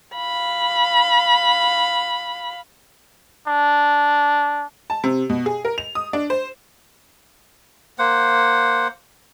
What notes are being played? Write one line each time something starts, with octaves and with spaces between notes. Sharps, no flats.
F5 B5
D4
A5
C3
B2
G#4
A#4
F7
D#6
D4
C5
A#3 C5 F#5